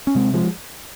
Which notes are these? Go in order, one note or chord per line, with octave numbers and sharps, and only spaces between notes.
C#4
C3 G#3 C4
F3 G#3